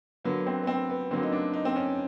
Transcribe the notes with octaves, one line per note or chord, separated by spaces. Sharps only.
D3 F#3 A#3 B3
C4
B3
C4
B3
D3 F#3 A#3 C4
D#4
D4
D#4
C4
C#4